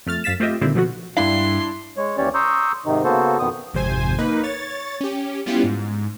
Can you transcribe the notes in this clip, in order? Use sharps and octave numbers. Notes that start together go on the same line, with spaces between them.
F2 A3 F6 A6
F#2 F5 A6 B6 E7
A3 C4 F4 G4 D#5 E5
A#2 D3 D#3 G3 C4 E4
B2 F3 F#3 A3 B3 F#4
G2 D4 E4 F5 C6
G#3 C#5
D#2 E3 C#4 G4 C#5 D5
A#5 C6 C#6 D#6 E6 G6
G#2 C3 D#3 D#4
C#3 A#3 B3 F#4 A4 C5
F2 B2 D#3 B3 D#6
G#1 F2 C3 C5 G#5
A#3 D#4 B4
C#5 A6
C#4 G4
G3 B3 C#4 E4 F4 G4
G#2